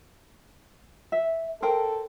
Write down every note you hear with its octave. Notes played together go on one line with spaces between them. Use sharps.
E5
A4 A#4 C5 G5